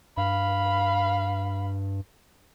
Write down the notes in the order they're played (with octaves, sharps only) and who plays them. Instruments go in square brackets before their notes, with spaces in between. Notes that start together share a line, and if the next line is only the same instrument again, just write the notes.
[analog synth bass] G2 [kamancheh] F5 B5